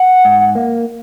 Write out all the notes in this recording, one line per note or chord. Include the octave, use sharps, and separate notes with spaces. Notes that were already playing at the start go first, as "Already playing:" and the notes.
Already playing: F#5
G#2
A#3